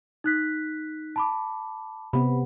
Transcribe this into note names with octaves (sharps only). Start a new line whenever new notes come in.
D#4 F#6 B6
A5 B5 D6
C3 B3 B5